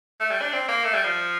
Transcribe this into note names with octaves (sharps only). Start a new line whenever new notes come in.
A3
G3
D4
C4
A#3
A3
G3
F3